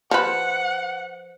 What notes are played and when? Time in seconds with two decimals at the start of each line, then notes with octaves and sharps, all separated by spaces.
0.11 F3 B4 F#5